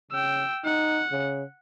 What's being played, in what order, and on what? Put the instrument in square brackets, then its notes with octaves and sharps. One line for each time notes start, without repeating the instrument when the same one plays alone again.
[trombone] C#3 [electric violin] G5 E6
[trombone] D#4 [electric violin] F#5
[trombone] C#3